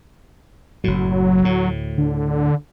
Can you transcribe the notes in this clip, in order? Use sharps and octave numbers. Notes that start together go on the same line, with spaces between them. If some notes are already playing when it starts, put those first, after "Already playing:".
F#1 A2 F#3
D2 A2
D3